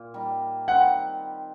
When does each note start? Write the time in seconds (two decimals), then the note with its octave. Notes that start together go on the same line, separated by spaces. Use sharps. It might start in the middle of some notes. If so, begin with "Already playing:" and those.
Already playing: A#2
0.14 G3 A#3 D#4
0.68 D#3 G3 C4 F#5